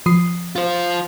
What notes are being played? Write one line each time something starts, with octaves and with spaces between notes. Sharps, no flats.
F3 D#6 C7
F4 C5